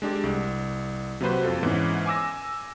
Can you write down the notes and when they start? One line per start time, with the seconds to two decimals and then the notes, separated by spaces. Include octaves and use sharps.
0.02 G#3 D4 G4 A4
0.24 C2
1.21 C3 F#3 A#3 F#4 B4 C5
1.44 F2 F4 A4
1.63 G#2 E3 B3 C#4
2.06 G#5 D6 E6 A#6